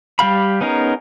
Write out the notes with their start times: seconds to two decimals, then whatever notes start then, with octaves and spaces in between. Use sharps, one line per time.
0.19 G3 G4 F5 B5
0.61 B3 C#4 D#4 G#4 A#4